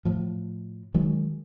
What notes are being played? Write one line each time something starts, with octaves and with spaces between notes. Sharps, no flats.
A2 F3
D#3 F#3 G#3